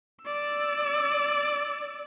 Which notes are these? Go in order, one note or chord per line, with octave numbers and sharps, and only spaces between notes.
D5 E6